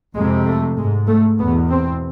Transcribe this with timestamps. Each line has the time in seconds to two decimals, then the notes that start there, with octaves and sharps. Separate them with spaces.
0.15 F2 C3 G#3
0.46 A3
0.76 G#2 G#3
1.07 A3
1.38 E2 B2 B3
1.69 C4